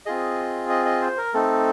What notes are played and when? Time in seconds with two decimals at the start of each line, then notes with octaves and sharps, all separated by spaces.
0.06 C4 F4 G#4 D#5
0.69 D#5
0.86 D#5
1.01 C5
1.18 A#4
1.34 A3 C4 D#4 A4